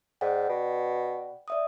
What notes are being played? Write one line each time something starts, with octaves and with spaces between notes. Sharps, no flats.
G#2 D5 F#5 G5
B2
D5 E5 D#6